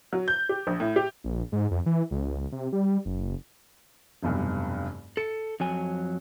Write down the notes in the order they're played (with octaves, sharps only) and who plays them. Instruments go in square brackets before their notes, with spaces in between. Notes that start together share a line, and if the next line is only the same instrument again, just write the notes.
[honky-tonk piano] F#3
G6
G4
A#1
A2
G4
[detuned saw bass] A#1
G#2
F2
E3
C#2
C3
G3
F#1
[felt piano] F1 B1 G2
[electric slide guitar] A4 [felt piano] C#7
[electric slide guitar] F2 F#3 G#5